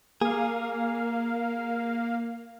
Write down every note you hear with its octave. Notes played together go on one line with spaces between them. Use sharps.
A#3 G#4 F5